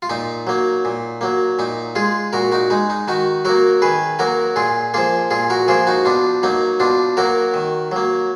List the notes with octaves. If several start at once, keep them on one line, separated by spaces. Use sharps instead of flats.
F4
A#2 D#4
F#3 A#3
A#2
F#3 A#3
A#2 D#4
G#3 F4 G#4
A#2 F#4 A#4
D#4 F#4
G#3 D#4
D#4
D#3 D#4 F#4
F#3 A#3 F#4 A#4
D#3 G#4 B4
F#3 A#3 F#4 A#4
A#2 F4 G#4
F3 A#3 F4 G#4
A#2 F4 G#4
F#4 A#4
F3 A#3 F4 G#4
D#4 F#4
B2 D4 F4
F#3 A#3 D#4
B2 D4 F4
F#3 A#3 F#4 A#4
D#3
F#3 A#3